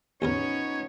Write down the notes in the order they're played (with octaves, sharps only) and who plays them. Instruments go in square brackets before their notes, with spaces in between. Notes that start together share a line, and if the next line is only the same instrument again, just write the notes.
[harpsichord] A1 E2 A#4 [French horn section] F3 B3 D#4 [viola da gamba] C#4 [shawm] C#5